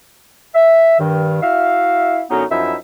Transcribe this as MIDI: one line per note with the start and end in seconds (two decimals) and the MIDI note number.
0.55 0.99 76
1.00 1.40 43
1.00 1.40 51
1.42 2.22 64
1.42 2.22 66
1.42 2.22 76
1.42 2.22 77
2.30 2.44 42
2.30 2.44 50
2.30 2.44 54
2.30 2.44 59
2.30 2.44 61
2.30 2.44 63
2.51 2.75 42
2.51 2.75 53
2.51 2.75 63
2.51 2.75 64
2.51 2.75 76